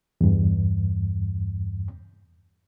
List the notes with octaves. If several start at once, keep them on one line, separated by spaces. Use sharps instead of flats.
E2 G2